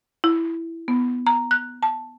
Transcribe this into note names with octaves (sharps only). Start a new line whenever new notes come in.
E4
B3
A#5
F#6
A5